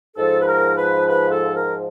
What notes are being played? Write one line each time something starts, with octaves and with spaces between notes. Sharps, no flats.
G#2 F3 A4
B4
A#4
B4
B4
A4
A#4